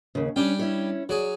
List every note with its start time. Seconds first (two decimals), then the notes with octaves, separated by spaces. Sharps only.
0.15 D#2 C#3
0.36 G3 C#4 D4 G5
0.59 C#4 E4 C#5
1.09 F#3 G#4 D5